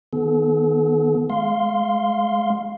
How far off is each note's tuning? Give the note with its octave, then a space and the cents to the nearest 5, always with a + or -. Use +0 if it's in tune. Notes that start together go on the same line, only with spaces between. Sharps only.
D#3 +0 B3 -10 A4 -40
G#3 +20 F5 +0 C6 +0